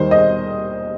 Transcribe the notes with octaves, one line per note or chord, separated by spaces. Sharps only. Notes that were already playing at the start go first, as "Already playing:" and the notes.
Already playing: D#2 D#3 G3 C5
D#5